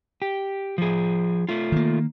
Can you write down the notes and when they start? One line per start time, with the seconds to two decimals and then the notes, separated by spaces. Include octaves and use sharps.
0.22 G4
0.78 F3 G#4
1.49 A3 F4
1.72 D#3 A#3